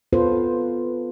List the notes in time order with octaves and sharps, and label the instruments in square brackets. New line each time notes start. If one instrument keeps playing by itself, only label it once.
[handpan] B3 F4 A4 B4 C5